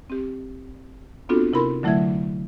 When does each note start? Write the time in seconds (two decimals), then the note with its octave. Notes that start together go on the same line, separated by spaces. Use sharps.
0.10 C4 G4
1.29 B3 C4 D4 F4 F#4 A4
1.53 C3 E4 A#4 B5 C6
1.83 D3 F#3 A3 E4 E5 G#6